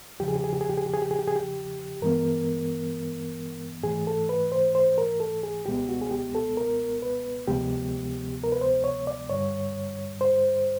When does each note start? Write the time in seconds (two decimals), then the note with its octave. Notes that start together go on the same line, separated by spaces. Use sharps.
0.19 E2 C#3 F3 G4
0.28 G#4
0.36 G4
0.44 G#4
0.53 G4
0.61 G#4
0.70 G4
0.78 G#4
0.86 G4
0.94 G#4
1.02 G4
1.11 G#4
1.19 G4
1.27 G#4
1.36 G4
2.02 G2 E3 G#3 B3 A#4
3.83 G#2 E3 A3 G#4
4.07 A4
4.29 B4
4.52 C5
4.75 C5
4.98 A#4
5.20 A4
5.43 G#4
5.65 C#2 B2 G#3 B3 G4
5.89 F#4
6.01 G#4
6.11 G4
6.35 A4
6.57 A#4
7.02 B4
7.48 D2 C3 F3 G#3 B3 G4
8.43 A#4
8.52 B4
8.61 C5
8.84 C#5
9.07 D5
9.30 G2 D3 G3 C#5
10.21 C5